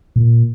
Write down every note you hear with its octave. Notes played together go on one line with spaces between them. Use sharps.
A#2